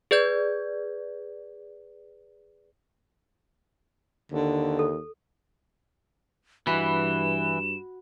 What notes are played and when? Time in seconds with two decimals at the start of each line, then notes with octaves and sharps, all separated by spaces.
0.11 G#4 B4 D5 G6 G#6
4.32 D#2 D3
4.79 A4
6.67 G2 E3 F#4 B5 E7